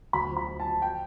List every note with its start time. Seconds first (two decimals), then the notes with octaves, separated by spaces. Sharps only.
0.13 D2 B5
0.30 F3
0.37 B5
0.48 F3
0.60 A5
0.65 F3
0.82 G5